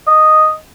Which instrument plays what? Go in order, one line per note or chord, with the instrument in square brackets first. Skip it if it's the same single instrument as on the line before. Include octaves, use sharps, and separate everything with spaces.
[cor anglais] D#5